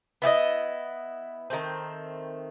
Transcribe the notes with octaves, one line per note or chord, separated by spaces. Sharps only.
B3 E4 G4 D#5
D#3 F#3 A3 C4